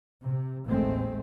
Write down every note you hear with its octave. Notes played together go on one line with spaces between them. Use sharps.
C3
A1 D#2 G#3 A3 C4